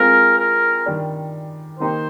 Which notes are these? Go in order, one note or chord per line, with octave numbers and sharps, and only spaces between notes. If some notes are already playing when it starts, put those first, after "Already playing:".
Already playing: G#3 C4 F4 A#4 C5
A#4
D#3 G3 D4
D#3 A#3 D#4 G4 C5